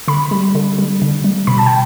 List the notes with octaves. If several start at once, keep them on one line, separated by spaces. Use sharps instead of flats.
D3 B5
G3
D3
G3
D3
G3
B2 B5
A5
G5